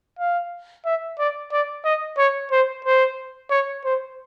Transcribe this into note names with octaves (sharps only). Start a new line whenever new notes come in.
F5
E5
D5
D5
D#5
C#5
C5
C5
C#5
C5